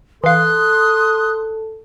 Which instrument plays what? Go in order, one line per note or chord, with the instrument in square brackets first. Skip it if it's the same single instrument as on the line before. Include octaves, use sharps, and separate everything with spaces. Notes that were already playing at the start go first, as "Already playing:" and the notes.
[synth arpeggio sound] E3 F5 [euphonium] A4 [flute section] C6 D#6 F#6